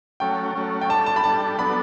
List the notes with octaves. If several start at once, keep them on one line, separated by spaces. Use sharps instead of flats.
F#3 A3 C#4 G5
F#3 A3 C#4
G5
G3 D4 A4 A5
A5
B5
G3 D4 A4 A5
F#3 B3 D4 A4 B5